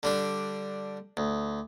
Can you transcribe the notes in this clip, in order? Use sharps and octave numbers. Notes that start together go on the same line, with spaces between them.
D3 G3 D4
D2